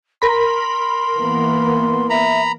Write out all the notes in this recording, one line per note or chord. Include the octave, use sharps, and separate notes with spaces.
A#4 B5 C6
E3 A#3 B3
E5 A#5 B5